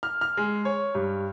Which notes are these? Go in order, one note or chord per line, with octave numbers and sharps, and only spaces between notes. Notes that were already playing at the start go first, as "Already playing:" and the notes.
F6
F6
G#3
C#5
G2